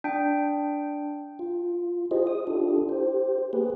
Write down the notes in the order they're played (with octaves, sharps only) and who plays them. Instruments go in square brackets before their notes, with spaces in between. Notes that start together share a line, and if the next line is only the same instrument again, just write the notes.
[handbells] D4 G5
[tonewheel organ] F4
E4 F4 G4 G#4 C5 D#5
D#6
D4 E4 F4 G4 A4
G4 C5
A#3 G4 G#4 B4